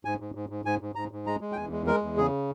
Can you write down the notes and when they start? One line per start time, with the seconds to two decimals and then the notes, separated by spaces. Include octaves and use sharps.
0.05 G#2 G#5
0.20 G#2
0.35 G#2
0.49 G#2
0.65 G#2 G#5
0.81 G#2
0.95 G#2 A#5
1.11 G#2
1.27 G#3 A#5
1.41 G#3
1.52 G5
1.56 E2 G#5
1.72 G#3
1.87 G#3 A#4
2.02 E2
2.17 C#3 G#4